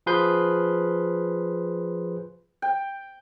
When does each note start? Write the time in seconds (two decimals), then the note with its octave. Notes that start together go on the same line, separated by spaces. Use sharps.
0.06 F3 G#4 B4 C6 G6
2.62 G5